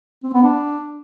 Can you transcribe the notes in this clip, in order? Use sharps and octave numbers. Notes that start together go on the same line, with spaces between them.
C4
B3
D4